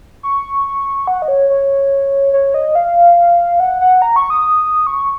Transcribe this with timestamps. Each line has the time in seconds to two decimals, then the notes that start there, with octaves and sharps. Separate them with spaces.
0.23 C#6
1.07 F#5
1.22 D#5
1.28 C#5
1.50 C#5
2.33 C#5
2.54 D#5
2.75 F5
3.60 F#5
3.81 F#5
4.02 A#5
4.16 C#6
4.30 D#6
4.87 C#6